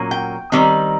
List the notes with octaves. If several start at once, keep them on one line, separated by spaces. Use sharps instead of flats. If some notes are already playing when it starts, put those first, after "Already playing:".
Already playing: A#2 F#3 A#3 C#4
G5
D#3 G3 C4 D#4